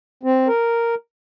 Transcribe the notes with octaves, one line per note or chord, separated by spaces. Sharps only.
C4
A#4